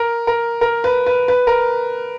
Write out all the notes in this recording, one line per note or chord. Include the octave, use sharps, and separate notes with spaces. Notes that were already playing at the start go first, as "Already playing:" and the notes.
Already playing: A#4
A#4
A#4
B4
B4
B4
A#4